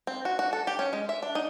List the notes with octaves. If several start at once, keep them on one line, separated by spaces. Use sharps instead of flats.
C4
F#4
F#4
A4
G4
C#4
G#3
E5
D4
D#4